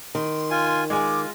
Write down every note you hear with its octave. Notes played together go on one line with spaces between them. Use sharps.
D#3 C6
F4 G#5
G#3 F4 G#5 D6